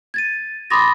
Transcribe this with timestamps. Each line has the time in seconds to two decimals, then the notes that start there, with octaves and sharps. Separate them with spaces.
0.14 G#6 A6 D#7
0.70 B5 C6 D6 D#6 A6 A#6